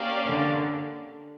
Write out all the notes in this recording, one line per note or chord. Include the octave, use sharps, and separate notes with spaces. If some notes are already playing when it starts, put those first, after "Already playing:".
Already playing: A#3 C#4 G4 D5 F5
D3